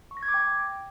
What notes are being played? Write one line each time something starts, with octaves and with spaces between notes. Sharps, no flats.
C#6
A#6
G#6
D6
G5